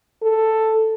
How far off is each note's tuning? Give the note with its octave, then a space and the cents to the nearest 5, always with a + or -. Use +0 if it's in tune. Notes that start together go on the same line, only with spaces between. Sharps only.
A4 +5